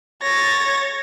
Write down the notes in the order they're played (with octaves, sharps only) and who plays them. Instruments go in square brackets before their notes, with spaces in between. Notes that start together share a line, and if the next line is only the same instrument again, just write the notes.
[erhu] C#5 [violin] A6 A#6